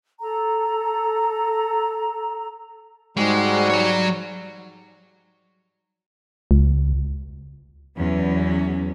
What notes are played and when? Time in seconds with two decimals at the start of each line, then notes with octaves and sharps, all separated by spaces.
0.21 A4 A#5
3.17 G#2 G3 G#3 F#4
3.70 F#3 C#5
6.51 C#2
7.97 E2 F#3 C#4